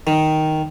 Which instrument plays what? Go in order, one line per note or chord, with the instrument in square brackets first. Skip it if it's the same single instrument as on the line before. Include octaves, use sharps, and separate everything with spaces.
[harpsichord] D#3